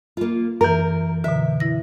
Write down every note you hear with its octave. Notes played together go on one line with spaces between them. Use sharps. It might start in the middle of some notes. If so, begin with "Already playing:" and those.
A#3 F4
F#2 E3 A#4
B2 D3 E5
E4 A#6